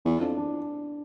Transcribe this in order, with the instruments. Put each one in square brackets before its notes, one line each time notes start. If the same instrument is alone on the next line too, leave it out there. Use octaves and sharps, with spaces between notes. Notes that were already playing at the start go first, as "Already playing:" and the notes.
[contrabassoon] E2 [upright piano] E4
[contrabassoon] F2 [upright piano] D4
[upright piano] D4